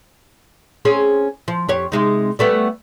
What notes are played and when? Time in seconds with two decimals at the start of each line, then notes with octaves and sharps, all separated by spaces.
0.85 C4 C#4 G#4
1.48 F3
1.69 F2 G4 C#5
1.92 C3 G#3 D#4
2.39 G3 A3 B3